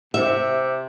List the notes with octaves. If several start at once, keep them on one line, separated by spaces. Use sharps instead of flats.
C3 E5